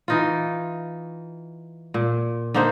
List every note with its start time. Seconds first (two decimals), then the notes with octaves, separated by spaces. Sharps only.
0.08 E3 D#4 F4
1.94 A#2
2.54 D3 A#3 D#4 C5